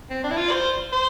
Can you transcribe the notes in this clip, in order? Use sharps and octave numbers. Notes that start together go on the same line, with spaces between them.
C4
D4
E4
F4
D5
C5
C5